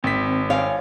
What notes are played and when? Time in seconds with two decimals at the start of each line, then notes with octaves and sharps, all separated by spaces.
0.04 G#1 C4 B6
0.50 C#5 F5 G5 G#5